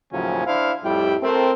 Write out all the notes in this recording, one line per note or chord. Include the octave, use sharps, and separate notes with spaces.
D#2 A2 C#3 F3 F#3 C#4
D4 E4 C5 F5
F2 A2 G3 E4 G4 G5
A3 C4 A#4